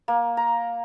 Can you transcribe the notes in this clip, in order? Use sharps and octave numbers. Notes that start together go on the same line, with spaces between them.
A#3
A#5